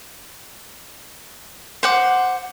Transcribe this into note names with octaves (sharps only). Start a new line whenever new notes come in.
C5 F#5 D6